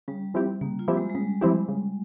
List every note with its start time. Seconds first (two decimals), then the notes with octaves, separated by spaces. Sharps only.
0.08 C#3 G3
0.34 F3 C4 E4 G4
0.61 C#3 A#3
0.79 F4
0.88 F3 C4 E4 G4
0.97 G#3
1.10 G#3
1.15 C#3 G3
1.41 F3 C4 E4 G4
1.68 C#3